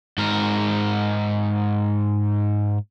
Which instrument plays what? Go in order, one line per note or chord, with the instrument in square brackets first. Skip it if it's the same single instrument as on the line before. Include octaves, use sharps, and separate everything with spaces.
[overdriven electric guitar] G#2 A#4